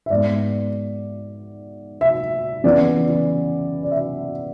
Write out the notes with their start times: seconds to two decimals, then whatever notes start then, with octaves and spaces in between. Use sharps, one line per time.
0.06 E5
0.10 G#2 G#3 B3 D5
2.01 E5
2.64 C#3 E3 B3 D5
3.83 D5
3.91 E5